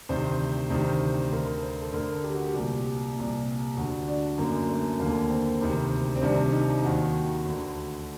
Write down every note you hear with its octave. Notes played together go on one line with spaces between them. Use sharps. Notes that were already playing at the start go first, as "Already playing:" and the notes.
D2 C3 D#3 C5
D2 C3 D#3
D2 D3 A#4
C5
A4
D2 D3 A#4
G4
F#4
G4
C2 A#2 G4
C2 A#2
D2 D3 F#4
D4
F#2 D3 A#3
A3
D#2 D3 A#3
C4
D2 C3 D#3
C4
C2 C3 D#3 D4
D#4
D#2 D#3 F#4
D2 D3